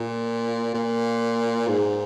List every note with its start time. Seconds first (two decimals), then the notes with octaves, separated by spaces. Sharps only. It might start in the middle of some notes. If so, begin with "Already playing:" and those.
Already playing: A#2
0.74 A#2
1.68 G#2